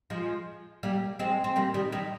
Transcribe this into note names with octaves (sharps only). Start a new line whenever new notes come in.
F3 G#3
G3 A#3
G#3 C4
C4
G3 A#3
D#3 G3
D#3 G3